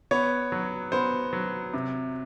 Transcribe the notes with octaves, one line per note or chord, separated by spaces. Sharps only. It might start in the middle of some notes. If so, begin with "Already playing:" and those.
B3 C#5
F#3
B3 C5
F#3
C3